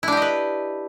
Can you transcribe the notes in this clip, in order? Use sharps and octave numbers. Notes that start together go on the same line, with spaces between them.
D4 E4 G4 B4 D#5